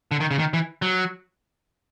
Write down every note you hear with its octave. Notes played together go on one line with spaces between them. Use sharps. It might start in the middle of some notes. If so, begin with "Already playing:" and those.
D3
D#3
C#3
D#3
E3
F#3